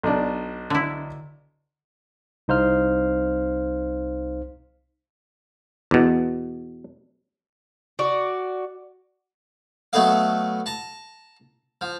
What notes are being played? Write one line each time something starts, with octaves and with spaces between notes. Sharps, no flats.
B1 D4
D3 E4
C2 D#4 C5 F5 F6
E2 B2
F#4 D5
F#3 A3 B3 A4 D#5 F5
A5 A#5
F3